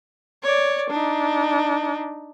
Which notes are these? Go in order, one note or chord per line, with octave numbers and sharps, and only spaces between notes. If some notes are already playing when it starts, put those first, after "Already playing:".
C#5 D5
D4 D#4